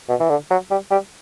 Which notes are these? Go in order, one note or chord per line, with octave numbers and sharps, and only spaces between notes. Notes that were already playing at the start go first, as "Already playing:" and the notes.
B2
E3
D3
F#3
G3
G3